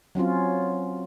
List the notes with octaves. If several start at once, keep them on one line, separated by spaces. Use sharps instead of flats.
F#3 C4 C#4 F4